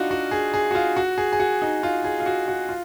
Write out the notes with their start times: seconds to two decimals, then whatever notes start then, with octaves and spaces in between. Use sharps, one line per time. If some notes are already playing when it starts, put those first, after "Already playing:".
Already playing: D4 D#4 F4 F#4
0.11 F#4
0.31 G#4
0.54 G#4
0.71 F#4
0.75 F4
0.96 F#4
1.18 G#4
1.33 G#4
1.40 F#4
1.62 D#4
1.83 F4
2.04 G#4
2.20 F4
2.26 F#4
2.48 F#4
2.69 F4